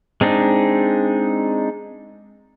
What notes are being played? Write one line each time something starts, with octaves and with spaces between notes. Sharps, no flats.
G#3 C4 D4 D#4